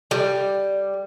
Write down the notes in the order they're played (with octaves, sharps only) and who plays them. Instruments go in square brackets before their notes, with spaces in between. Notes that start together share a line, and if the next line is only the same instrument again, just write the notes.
[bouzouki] G3